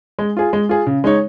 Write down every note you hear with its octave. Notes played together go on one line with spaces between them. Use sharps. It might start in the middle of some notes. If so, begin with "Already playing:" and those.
G#3
F4 G#4
G#3
F4 G#4
C#3
G#3 D#4 C#5